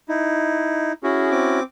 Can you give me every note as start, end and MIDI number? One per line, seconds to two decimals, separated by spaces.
0.09 0.92 63
0.09 0.92 64
1.03 1.60 61
1.03 1.60 64
1.03 1.60 66
1.03 1.29 68
1.31 1.63 60
1.31 1.63 86